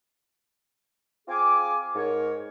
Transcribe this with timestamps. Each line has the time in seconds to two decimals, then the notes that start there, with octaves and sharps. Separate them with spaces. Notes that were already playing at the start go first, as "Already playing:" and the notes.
1.28 C4 F4 G#4 F5 G#5 D6
1.95 G#2 A#4 C#5